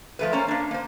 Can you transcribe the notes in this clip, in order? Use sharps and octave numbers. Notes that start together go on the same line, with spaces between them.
F3 A3 B4
A#3 C#4 C5 A#5
A#3 D4
A#3 C5